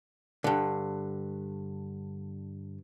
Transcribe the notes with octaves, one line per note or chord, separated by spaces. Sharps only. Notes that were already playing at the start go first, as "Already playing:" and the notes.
G2 D3